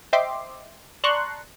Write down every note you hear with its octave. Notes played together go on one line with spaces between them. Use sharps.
C5 D#5 E5 G5 C6 D6
D5 A5 A#5 C6 C#6 F#6